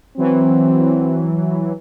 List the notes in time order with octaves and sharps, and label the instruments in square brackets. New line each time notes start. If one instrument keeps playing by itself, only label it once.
[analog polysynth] E3 F#3 [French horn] C4